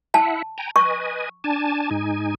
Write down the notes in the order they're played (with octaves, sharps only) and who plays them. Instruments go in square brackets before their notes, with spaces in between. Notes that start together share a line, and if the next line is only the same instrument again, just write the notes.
[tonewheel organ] E4 E5 F#5 [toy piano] A5
[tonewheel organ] G5 G#5 A#5
[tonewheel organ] B4 D#5 G#5 [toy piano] C#6
[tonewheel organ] D4 G#5 A5
G#2 D#4 G#5